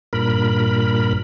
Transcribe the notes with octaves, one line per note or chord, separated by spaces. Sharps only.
G2 A#2 A#4 B5